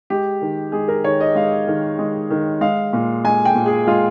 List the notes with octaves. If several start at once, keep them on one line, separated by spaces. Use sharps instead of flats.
G#3 G4
D#3
G#3 G#4
A#4
D#3 C#5
D#5
G#3 F5
D#3
G#3
D#3
G#3 F5
A#2
G#3 G#5
G5
A#2
G#4
G#3 F4